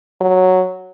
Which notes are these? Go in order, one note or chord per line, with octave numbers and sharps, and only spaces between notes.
F#3